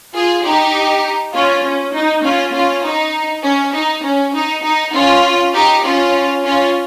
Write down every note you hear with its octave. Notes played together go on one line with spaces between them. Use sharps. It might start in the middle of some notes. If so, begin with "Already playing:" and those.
F4 G#4
D#4 G4
C#4 F4
C#4
D#4
C#4 F4
C#4 F4
D#4
C#4
D#4
C#4
D#4
D#4
C#4 F4
D#4 G4
C#4 F4
C#4 F4